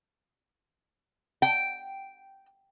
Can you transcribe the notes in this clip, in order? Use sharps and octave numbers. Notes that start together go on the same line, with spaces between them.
G5